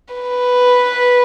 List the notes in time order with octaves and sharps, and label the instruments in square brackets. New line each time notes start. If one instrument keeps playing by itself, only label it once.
[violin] B4